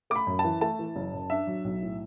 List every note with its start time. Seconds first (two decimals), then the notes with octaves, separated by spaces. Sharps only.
0.10 A3 D6
0.16 B5
0.27 F#2
0.39 A5
0.44 E3
0.61 A3 A5
0.79 E3
0.96 F#1
1.13 F#2
1.30 D4 E5
1.47 F#3
1.64 B1
1.82 A2